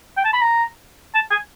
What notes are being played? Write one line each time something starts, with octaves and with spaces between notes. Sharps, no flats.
G5
A5
B5
A#5
A5
G#5